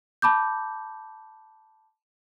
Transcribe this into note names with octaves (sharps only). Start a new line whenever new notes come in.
A5 B5 D6 G6